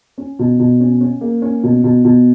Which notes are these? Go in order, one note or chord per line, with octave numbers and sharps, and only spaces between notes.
C#4
B2
B2
C#4
C#4
A#3
C#4
B2
B2
B2